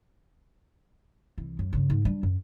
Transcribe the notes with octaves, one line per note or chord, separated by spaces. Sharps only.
C2 E3
F#2
G2 C#3
G#2
G3 D4
F#2